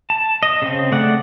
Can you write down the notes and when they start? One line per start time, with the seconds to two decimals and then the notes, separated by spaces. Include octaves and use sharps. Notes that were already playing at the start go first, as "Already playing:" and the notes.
0.10 A5
0.43 D#5
0.62 C#3 C4
0.92 A3 D5 F#5